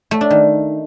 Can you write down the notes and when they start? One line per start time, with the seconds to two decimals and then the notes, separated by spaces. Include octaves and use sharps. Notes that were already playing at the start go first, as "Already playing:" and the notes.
0.11 A3
0.21 D4
0.31 D#3